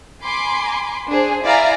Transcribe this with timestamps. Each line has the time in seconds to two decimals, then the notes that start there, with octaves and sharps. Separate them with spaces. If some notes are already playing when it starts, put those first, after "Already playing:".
0.23 G#5 B5 C6 D6
1.10 D4 G#4 C5
1.45 E4 D5 E5 F5 G#5 A#5